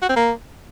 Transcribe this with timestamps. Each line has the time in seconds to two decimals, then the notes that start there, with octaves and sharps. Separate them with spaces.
0.02 F#4
0.09 C4
0.16 A#3